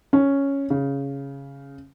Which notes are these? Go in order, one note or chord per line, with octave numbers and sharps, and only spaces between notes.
C#4
C#3